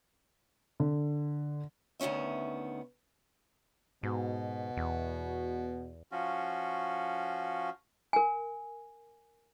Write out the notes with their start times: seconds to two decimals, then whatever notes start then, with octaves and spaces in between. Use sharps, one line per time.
0.80 D3
2.00 D2 D#3 B3 C#4 E5
4.03 G#2 B2
4.77 E2
6.11 F3 C#4 F4 F#4
8.13 A#4 G#5